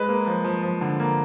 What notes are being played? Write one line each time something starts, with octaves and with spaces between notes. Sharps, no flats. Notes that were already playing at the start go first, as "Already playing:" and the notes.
Already playing: G#3 B4
A#3
F3
F3
F3
D3
A#3